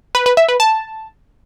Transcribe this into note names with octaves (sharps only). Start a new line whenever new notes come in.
B4
B4
E5
B4
A5